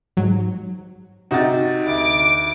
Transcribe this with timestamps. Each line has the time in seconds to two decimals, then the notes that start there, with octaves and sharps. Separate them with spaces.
0.17 G#2 F#3
1.31 C3 D#4 F#4 A6
1.86 D2 D6